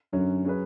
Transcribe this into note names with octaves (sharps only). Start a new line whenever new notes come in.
F#2 D3 F#3 C#4
F#3 C#4 G#4 B4